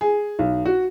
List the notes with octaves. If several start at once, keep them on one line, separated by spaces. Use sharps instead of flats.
G#4
B1
F#4